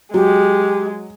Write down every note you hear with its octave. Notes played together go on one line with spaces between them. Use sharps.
F#3 G#3 G4